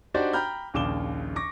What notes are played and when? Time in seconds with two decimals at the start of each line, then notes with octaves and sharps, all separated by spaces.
0.14 D4 D#4 F#4 G4 C5 D5
0.33 G5 A#5 B5 F6 G6
0.74 A#1 D#2 C#3 D6 E7 G7
1.36 C#6 D6 A#6